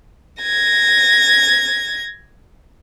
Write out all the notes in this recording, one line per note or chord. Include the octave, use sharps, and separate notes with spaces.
G#6 A#6